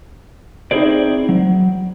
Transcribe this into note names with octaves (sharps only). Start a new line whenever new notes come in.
C4 D#4 E4 G#4 C5 D5
F#3